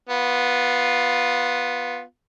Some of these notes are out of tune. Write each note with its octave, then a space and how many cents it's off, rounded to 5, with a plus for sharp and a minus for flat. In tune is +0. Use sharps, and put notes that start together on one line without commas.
B3 -5 F4 +10